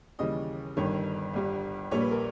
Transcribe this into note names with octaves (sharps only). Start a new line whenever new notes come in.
D#2 C#3 E3 G3 D#5
G1 G2 D#3 C#5
G1 G2 G3
A#1 A#2 G3 C#5
B4
A#4